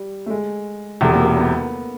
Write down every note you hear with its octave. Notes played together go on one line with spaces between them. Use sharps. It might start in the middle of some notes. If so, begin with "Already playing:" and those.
Already playing: G3
A3
G#3
E1 E2 C3 A3
A#3
A#3
B3